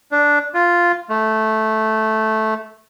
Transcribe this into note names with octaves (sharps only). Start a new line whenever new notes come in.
D4
F4
A3